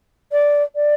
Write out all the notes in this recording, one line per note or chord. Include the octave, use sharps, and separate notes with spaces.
D5
D5